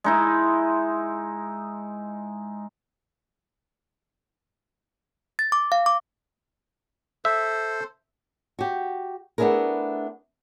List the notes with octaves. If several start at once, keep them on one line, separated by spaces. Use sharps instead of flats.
G#3 D#4 E4
A6
D6
F5
D6
A4 C5 E5
F#4 G4
A3 B3 D4 E4 G#4 A#4